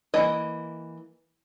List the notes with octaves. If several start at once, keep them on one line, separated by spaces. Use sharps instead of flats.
E3 A#3 D#5